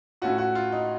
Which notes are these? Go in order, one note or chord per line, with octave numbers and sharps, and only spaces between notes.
A2 A3 C#4 F4 F#4
F#4
F4
D#4